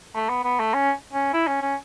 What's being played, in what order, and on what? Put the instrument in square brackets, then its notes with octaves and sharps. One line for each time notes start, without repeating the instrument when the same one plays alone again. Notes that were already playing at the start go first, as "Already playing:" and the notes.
[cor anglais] A3
B3
B3
A3
C#4
C#4
E4
C#4
C#4